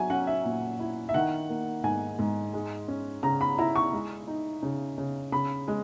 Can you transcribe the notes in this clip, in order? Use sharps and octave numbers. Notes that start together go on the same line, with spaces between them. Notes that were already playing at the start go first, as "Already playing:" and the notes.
Already playing: F#3 E5 G#5
C#4 F#5
E5
A#2
E4
E5
D#3 F#5
A#3
G#2 G#5
G#2
G#3
C#4
C#3 A#5
B5
E4 A#5
C#6
G#3
D#4
C#3
C#3
C#3 B5
G#3